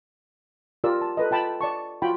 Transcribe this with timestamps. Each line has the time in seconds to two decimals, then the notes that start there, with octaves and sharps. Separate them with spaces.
0.84 F4 G4 A#4 D5 E6
1.01 A5
1.17 A4 B4 D#5
1.31 F4 G5 A5 B5
1.61 D5 A5 C#6
2.02 F4 F#4 G5 B5